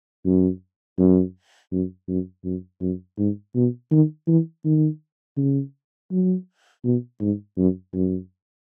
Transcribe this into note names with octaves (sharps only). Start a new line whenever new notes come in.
F#2
F#2
F#2
F#2
F#2
F#2
G#2
B2
D#3
E3
D#3
C#3
F#3
B2
G#2
F#2
F#2